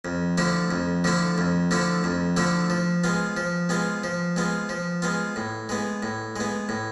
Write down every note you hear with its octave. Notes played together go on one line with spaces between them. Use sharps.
F2
D3 F3 A3 E4
F2
D3 F3 A3 E4
F2
D3 F3 A3 E4
F2
D3 F3 A3 E4
F3
G#3 B3 F4
F3
G#3 B3 F4
F3
G#3 B3 F4
F3
G#3 B3 F4
A2
G#3 B3
A2
G#3 B3
A2